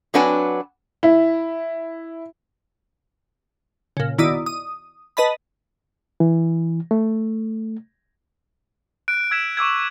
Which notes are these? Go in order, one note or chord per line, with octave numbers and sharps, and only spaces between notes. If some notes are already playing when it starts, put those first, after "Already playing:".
F#3 C4 D4 B4 F#5 G#5
E4
A#2 C#3
B1 D#3 E4 D5 D#6
D#6
B4 D#5 A5 B5
E3
A3
F#6 D7
E6 G#6 B6 E7
C#6 D6 E6 G#6